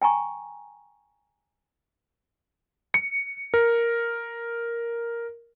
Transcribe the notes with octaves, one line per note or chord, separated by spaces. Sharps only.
G5 G#5 A#5 C#6
C#7
A#4